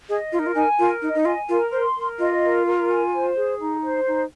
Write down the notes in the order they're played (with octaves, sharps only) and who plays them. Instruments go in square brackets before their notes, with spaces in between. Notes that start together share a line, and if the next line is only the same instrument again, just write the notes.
[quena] G#4 [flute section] D#5
[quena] F4 [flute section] A#4
[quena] D#4
F4
[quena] D#4 [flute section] G#5
[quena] F4 [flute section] A#4
[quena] D#4 [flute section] D#5
[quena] D#4
[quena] F4 [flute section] G#5
[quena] F4 [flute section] A#4
[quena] C5 [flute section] C6
[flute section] A#4
[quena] F4 [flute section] D#5
[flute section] A#4
A#4
G#5
C5
G#4
D#4
C5
D#4